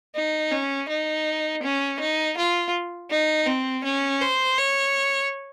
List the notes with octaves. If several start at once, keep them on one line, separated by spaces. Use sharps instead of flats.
D#4
C#4
D#4
C#4
D#4
F4
D#4
C4
C#4
C5
C#5